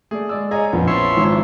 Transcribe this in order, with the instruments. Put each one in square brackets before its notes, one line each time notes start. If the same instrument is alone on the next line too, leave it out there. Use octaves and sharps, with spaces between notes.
[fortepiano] A3 D5 [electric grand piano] G#4
[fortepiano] G#3 D5 E6
[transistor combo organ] G#4 [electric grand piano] C#5 G#5 A#5 [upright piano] D#5
[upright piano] A#1 [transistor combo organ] F2 [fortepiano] B3 C#4
[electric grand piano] F3 E4 F4 [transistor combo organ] C#5 E5 C6
[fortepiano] G#1 G#2